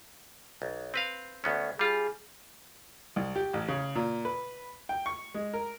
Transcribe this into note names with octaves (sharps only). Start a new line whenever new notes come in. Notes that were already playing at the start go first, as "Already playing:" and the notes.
B1
C4 B4 F5
D2 B3 C#4
G3 F4 G#4
C2
G4
A1
C#3
A#2
B4
G5
C#6
G#3
A#4